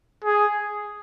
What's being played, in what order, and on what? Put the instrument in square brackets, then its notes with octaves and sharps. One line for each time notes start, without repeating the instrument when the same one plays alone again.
[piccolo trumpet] G#4